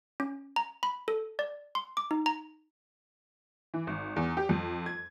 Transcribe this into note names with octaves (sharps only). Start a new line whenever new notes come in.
C#4
A#5
B5
A4
D5
C6
D6
D#4
A#5
E3
G#1
E2
G4
F2
G#6